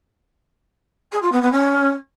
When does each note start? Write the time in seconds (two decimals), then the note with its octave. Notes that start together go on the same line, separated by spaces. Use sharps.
1.11 G#4
1.21 F4
1.32 B3
1.42 B3
1.52 C#4